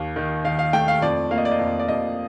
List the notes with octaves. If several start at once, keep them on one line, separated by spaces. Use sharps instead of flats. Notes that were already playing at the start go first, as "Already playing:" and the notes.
Already playing: D#2 A#3
D#3
D#3 F5
F5
A3 G5
F5
F2 D5
A#3 F5
D#5
D5
D#5
F2
D5
F2 D#5